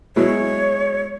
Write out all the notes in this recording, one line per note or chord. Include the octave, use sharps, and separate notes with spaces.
B2 F#3 G#3 E4 C#5